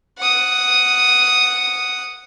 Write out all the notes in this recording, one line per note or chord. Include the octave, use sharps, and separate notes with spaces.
F#5 D#6